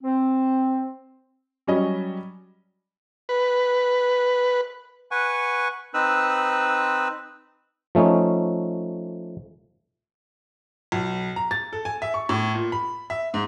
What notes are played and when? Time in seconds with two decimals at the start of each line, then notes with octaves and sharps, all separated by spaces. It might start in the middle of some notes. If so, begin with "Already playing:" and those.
0.03 C4
1.67 F#3 G3 C#4 F#4 D#5
3.29 B4
5.11 B4 F#5 G#5 C#6
5.94 C4 D#4 B4 E6 F#6
7.95 F3 A3 C#4 D#4
10.92 B1
11.36 A#5
11.51 A6
11.73 A4
11.85 G#5
12.02 E5
12.14 C#6
12.29 A2
12.54 A#2
12.72 B5
13.10 E5
13.34 G#2